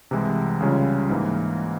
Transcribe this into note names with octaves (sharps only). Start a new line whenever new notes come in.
C2 C3 E3 G#3 E4
C#2 C#3 G3 C#4 F4
G#2 E3 A#3